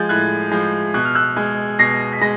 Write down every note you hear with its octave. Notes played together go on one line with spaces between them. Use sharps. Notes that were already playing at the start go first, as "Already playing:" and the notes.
Already playing: F3 G#3 G6 A6
A2 F#6 G#6
F3 G#3
B2 F#6
F6
E6 F#6
G#3
B2 A#6 C7
B6
G#3 A#6